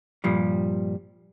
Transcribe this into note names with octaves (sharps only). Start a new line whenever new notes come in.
G2 A#2 F3 G3